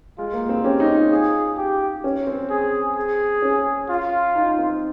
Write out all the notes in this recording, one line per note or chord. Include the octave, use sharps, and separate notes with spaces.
G#3 F4
A#3
C4
C#4 G4
D#4
F4
G#4
G4
C#4
C4
G#4
G#4
C#4
F4
D#4
C4